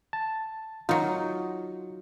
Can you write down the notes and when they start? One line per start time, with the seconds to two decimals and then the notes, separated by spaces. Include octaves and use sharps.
0.13 A5
0.89 F#3 D#4 F4